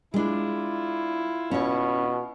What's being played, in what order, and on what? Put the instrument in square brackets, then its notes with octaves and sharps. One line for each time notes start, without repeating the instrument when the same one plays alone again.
[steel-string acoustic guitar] G#3 D4 [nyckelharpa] E4 F4
[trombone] B2 [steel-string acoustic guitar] C#4 C#5